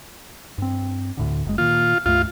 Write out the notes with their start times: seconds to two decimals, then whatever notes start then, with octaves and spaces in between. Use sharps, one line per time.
0.58 G2 C4
1.17 D2 A2 D3
1.45 F#1 A#2 G#3
1.58 A#2 D#3 A#3 F4
2.06 C#2 G2 A3 F4